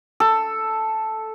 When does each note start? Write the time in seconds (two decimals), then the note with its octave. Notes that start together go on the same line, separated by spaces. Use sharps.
0.20 A4